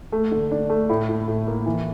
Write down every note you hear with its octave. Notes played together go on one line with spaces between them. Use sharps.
A3
D3
D4
A3
A2
A2
A2
A#3
E3